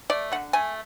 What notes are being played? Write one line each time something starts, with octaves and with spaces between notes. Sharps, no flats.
A3 D5
D3 F#5
A3 G#5